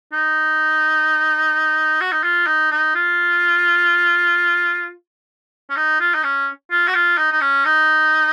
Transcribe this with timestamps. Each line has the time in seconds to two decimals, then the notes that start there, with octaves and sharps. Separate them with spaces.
0.12 D#4
2.00 F#4
2.12 D#4
2.23 F4
2.47 D#4
2.71 D#4
2.95 F4
5.70 C#4
5.76 D#4
6.00 F4
6.14 D#4
6.23 C#4
6.71 F4
6.87 F#4
6.94 F4
7.17 D#4
7.31 D#4
7.41 C#4
7.65 D#4